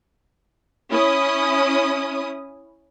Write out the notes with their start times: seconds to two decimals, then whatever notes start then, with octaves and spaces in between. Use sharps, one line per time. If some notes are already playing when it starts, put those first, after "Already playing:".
0.90 C#4 E4 D#6